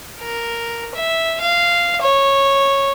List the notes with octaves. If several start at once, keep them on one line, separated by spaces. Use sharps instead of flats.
A#4
E5
F5
C#5